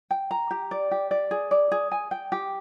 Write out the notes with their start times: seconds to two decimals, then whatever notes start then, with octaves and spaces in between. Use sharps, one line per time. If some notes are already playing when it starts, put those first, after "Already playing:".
0.11 G5
0.31 A#5
0.51 G4
0.71 D5
0.91 G4
1.11 D5
1.31 G#4
1.51 D5
1.71 G#4
1.91 G#5
2.11 G5
2.32 G4